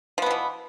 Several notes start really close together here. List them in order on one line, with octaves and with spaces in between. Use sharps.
F3 B3 B2 E3